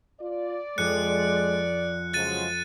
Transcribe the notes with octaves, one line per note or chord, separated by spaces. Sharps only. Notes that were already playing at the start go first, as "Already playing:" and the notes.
F4 D5
F2 G#3 F4 F#6 C#7
C#3 F3 F#3 G#3 F#6 A6 D#7